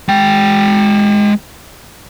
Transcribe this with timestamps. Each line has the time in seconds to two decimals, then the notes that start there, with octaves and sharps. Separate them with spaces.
0.09 G#3 G5